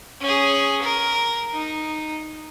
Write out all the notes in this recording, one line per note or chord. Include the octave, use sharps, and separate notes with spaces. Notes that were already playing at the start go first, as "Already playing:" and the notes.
C#4 G#4
A#4
D#4